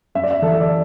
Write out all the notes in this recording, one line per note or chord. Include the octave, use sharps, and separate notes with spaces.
F#2 E5
D5
E5
E3 A4
D5